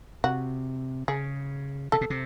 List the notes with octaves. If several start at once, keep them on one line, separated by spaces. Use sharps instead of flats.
C3 F#4
C#3 G#4
C3 A4
B2
C3